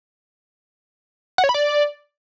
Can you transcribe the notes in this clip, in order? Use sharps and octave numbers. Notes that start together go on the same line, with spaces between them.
F#5
C#5
B5
D5